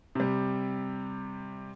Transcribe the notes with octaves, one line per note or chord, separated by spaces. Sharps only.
C3 G3